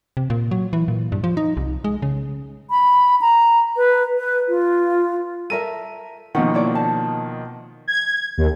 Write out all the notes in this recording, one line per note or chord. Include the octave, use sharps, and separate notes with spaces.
C3
A#2
F#3
E3
A#2
G2
F3
D#4
C2
G#3
C#3
B5
A#5
B4
B4
F4
A4 A#4 E5 D#7
B2 D#3 F3 A#3 C#4 D#5 F#5
E4 C#5 D5
A5
G#6
D#2